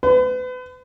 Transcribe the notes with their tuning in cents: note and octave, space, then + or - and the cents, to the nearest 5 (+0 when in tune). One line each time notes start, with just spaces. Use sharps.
B4 +35